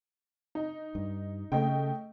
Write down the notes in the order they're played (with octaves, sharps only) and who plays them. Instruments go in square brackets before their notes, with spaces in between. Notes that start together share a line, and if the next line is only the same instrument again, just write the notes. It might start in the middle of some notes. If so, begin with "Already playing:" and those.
[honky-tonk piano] D#4
[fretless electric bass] G2
[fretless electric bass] C#3 [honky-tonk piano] A3 D#5 G5